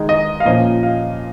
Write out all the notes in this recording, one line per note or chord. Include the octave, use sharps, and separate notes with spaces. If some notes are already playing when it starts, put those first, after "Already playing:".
Already playing: D#3 G#3 D#4
D#5
F5
A#2 F3 C#4 D#5
F5